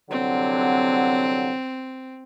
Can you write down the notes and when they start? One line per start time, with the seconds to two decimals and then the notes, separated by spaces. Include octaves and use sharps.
0.11 C2 D3 F#3 C4